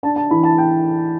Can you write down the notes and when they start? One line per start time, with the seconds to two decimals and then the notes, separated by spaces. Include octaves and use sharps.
0.03 D4 A5
0.16 A5
0.31 E3 B5
0.44 A5
0.58 G5